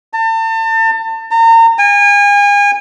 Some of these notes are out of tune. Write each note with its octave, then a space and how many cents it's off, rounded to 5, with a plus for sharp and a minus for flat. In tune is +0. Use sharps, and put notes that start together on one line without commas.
A5 +35
A#5 -35
G#5 -35